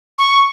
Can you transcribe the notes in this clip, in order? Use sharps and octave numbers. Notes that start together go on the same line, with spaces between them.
C#6